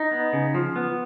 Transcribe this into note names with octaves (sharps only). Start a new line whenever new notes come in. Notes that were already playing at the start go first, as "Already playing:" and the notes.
Already playing: D#4
B3
C#3
F3
B3